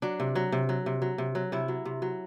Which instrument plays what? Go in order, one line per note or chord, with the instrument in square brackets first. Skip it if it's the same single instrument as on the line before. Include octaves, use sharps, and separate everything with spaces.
[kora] F#3 D4
C3
F#3
C3
F#3
C3
F#3
C3
F#3
C3 E4
F#3
C3
F#3